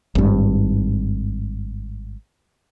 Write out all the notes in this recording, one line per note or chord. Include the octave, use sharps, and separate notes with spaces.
G#1 G2